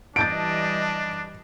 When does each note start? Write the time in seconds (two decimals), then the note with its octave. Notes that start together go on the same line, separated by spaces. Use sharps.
0.16 E3 G3 D4 D#5 A5 G6 A6 D7